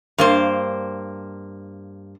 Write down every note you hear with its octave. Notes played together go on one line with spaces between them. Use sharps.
G2 A#3 C5